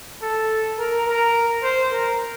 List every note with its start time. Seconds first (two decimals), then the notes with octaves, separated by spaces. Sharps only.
0.22 A4
0.79 A#4
1.07 A#4
1.63 C5
1.92 A#4